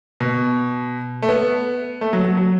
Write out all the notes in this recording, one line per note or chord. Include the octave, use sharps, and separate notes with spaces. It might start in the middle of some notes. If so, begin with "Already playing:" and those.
B2
A3
B3
A3
F#3
F#3
F#3